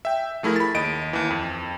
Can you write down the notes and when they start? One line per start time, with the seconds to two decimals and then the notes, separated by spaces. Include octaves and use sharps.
0.05 E5 G5
0.43 F3 A3 E4 G#4 A#4
0.56 B5 A6
0.74 D#2 D#5 D7
1.13 D#2 E3
1.30 F2